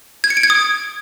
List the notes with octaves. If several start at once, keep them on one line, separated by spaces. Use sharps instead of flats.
G#6
C#7
D7
G#6
D#6